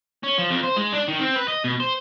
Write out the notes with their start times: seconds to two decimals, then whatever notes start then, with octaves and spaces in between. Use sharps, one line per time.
0.24 C#4
0.39 F3
0.51 F2
0.64 C5
0.77 G#3
0.94 D4
1.08 D#3
1.20 C4
1.36 B4
1.48 D#5
1.64 B2
1.80 C5